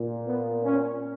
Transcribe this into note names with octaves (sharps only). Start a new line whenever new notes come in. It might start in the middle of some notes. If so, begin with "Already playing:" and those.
Already playing: A#2
B3
C#4